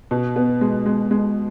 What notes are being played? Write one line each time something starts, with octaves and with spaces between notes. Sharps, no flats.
B2
B3
G#3
G#3
G#3